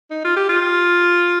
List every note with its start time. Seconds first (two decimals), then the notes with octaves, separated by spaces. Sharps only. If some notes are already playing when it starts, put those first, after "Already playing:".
0.11 D#4
0.25 F4
0.36 G4
0.49 F4